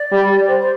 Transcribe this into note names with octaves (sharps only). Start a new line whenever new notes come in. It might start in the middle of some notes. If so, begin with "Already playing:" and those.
Already playing: D5
G3
C5
C5